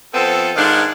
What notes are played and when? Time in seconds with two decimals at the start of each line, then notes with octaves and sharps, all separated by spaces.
0.14 F3 B3 C4 A4
0.56 G#2 D#3 D4 F5 F#5